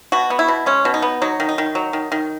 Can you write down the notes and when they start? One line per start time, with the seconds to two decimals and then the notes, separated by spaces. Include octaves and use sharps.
0.12 B2 F#4
0.30 B3
0.39 E4
0.48 B2
0.66 G#3 C#4
0.85 B2
0.94 D#4
1.02 B3
1.22 F#3 D#4
1.40 D#3
1.49 D#4
1.58 D#3
1.75 F#3
1.93 D#3
2.12 D#3